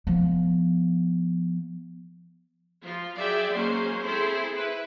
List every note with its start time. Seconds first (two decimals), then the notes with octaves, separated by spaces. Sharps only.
0.07 F3 B3
2.82 F3 F4
3.17 F#3 G#4 D5 E5 G5
3.51 F#3 G#3 A#3 C#4 C5
4.04 C4 E4 G#4 A4 C5
4.53 E4 B4